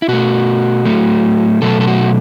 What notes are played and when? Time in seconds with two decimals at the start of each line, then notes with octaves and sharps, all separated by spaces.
0.02 E4
0.08 B2 A3 F#4
0.85 A2 F#3 A3
1.62 B2 F#3 A3 A4
1.81 A4
1.87 F#4